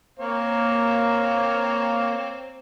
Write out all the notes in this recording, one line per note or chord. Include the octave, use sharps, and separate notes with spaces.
A#3 C4 C#5